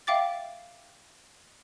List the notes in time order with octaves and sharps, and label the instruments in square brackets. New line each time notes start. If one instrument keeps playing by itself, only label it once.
[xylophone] E5 F5 G5 D6 A6